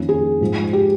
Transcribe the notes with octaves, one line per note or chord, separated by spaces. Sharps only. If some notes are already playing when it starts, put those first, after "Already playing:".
Already playing: F2 D#3 A#3 C#4
G#4
G#2 F3 G#3
G4